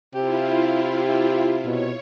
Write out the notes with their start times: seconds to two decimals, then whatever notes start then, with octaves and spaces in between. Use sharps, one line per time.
0.15 C3 E4 F4 G4
1.65 B2 C#5